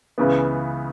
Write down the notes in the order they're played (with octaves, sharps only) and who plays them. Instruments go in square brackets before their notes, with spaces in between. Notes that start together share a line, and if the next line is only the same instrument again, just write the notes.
[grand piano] C#2 C#3 E3 B3